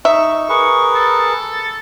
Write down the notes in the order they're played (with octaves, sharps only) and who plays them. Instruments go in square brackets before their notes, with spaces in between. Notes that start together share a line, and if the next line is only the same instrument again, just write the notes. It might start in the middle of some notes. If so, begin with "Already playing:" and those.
[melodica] D#4 C#6 [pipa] E5
[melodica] G#4 A#4 B4 [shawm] C#6
[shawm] A4